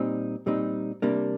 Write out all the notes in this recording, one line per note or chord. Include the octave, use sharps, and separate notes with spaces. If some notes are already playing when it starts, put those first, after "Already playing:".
Already playing: A#2 G3 C4 D#4
A#2 G3 C4 D#4
C3 G3 A#3 D4